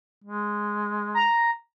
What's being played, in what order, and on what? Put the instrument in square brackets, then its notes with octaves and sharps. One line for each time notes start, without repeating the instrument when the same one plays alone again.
[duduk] G#3
[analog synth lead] A#5